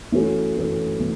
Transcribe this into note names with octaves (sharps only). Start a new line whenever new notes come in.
E3 A3 C#4 F#4 A4
E3 A3 C#4 F#4 A4
E3 A3